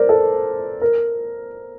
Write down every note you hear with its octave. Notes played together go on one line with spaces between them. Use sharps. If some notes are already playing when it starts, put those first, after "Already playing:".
Already playing: A#4 C5 D5
A4
A#4